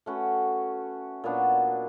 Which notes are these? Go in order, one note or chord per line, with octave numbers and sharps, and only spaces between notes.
A3 C#4 F#4 B4
A#2 F#3 B3 D4